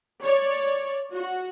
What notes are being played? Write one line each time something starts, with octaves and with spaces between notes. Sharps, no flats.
C#5 D5
F#4